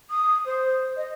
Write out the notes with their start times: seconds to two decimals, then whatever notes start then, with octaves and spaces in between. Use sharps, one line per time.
0.10 D#6
0.46 C5
0.97 D#5